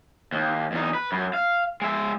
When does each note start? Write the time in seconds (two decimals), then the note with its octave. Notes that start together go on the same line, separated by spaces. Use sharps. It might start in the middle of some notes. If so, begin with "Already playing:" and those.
0.32 D#2
0.72 E2 D#4
0.94 B4
1.12 F#2
1.34 F5
1.82 G#3 E5